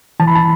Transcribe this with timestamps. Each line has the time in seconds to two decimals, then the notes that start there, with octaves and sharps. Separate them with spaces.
0.20 E3 A5
0.27 B5
0.35 A5